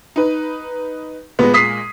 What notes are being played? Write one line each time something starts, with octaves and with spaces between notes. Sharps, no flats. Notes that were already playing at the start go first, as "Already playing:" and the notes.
D#4 B4
A#2 G#3 B3
D#6 B6 C7